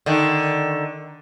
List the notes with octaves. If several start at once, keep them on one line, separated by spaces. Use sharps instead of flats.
D3 D#3